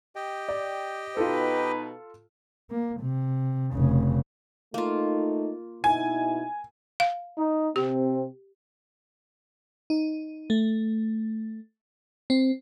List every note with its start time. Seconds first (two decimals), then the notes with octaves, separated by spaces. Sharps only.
0.16 G4 D#5 G5
0.49 D5
1.17 B2 D#4 F4 A4 B4
2.70 A#3
3.01 C3
3.74 F1 C#3
4.74 A3 A#3 D#4 F4
5.84 B2 D#4 E4 G#5
7.00 F5
7.38 D#4
7.76 C3 C4 G4
9.90 D#4
10.50 A3
12.30 C4